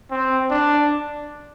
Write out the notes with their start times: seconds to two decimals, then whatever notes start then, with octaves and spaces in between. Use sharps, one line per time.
0.11 C4
0.50 D4